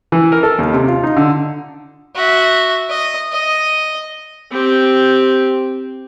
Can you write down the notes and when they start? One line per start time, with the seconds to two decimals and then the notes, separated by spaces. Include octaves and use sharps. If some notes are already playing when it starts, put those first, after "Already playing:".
0.12 E3
0.32 A#4
0.43 A4
0.59 D#2
0.73 C3
0.88 F4
1.03 D#4
1.17 D3
2.15 F#4 E5
2.90 D#5
3.32 D#5
4.51 C4 G4